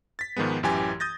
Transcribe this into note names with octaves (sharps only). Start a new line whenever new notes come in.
A6 B6
G#2 D#3 F3 G#3 B3
A1 F#2 E3 G4 G#5 G#6
D#6 G6 A6 A#6